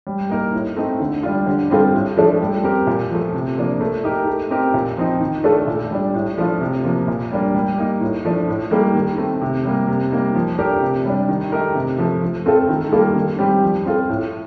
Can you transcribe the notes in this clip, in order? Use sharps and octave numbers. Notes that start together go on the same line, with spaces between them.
G3
A#3 D#4 A#4
A2
A3 C4 D#4
D3
G3 D4 F4
D3
G3 C4 F4 A4
A2
F3 A3 D4 A4
G3
C4 G4 A#4
A#2
F3 A3
C3
F3 A#3 D4
A3
D#4 G4 A#4
A3
C4 D#4 G4 A#4
A#2
F3 C4 D#4
D#3
A3 D4 F4 A4
A#2
G3 D4
A2
F3 A3 D4 F4
C3
F3 A#3
A#2
G3 A#3 D4
G3
A#3 D#4
A2
F3 A3 D4
A2
G3 A#3 D#4 A4
D#3
A3 C4
C3
G3 A#3
C3
G3 A#3 D#4
F3
A3 D4 G4 A#4
C3
G3 D4
D#3
A3 D#4 G4 A#4
C3
F3 A3
F3
A3 C4 F4 A4
D#3
G3 A#3 F4 A4
D#3
G3 C4 G4
F3
C4 F4 A4
A2